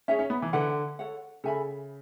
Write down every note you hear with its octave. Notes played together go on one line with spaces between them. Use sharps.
C#4 G#4 C#5 E5 G#5
C#4
B3
E3
D3 E4 B4 F#5
A4 C#5 F#5
C#3 A4 E5 G#5 B5